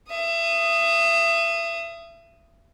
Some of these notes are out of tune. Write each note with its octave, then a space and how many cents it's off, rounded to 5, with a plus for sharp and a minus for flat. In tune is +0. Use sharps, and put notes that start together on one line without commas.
E5 +30 D#6 +0